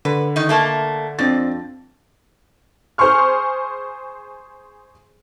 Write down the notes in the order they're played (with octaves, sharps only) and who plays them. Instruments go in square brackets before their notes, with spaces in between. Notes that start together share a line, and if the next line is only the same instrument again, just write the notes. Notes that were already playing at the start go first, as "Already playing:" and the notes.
[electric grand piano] D3 [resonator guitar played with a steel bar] B4
[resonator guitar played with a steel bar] D#3 D#4
A3 A#3 A5
[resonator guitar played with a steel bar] F2 [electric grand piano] C4 D4 A6
[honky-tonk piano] G#4 C5 G#5 C6 C#6 F6